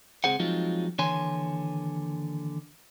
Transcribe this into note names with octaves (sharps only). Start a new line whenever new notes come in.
C#2 A#2 C4 G#4 C5 F#5
F3 F#3 G#3 C4 D#4 F4
D#2 D3 E3 C#5 G#5 C6